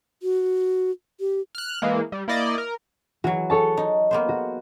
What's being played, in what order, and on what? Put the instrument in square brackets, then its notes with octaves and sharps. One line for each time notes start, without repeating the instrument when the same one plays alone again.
[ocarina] F#4
G4
[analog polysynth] F6 F#6
E3 G#3 A#3
G3
A#3 E4 D5 D#5
A#4
[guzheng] E3 F#3 [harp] F#4
[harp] A4 C#5 A5
[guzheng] D#4
A#3 B3 C5
[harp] F#4